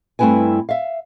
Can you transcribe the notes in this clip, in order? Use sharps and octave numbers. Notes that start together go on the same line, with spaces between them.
G2 A3 C4 E4 B4 G#5
E5 F5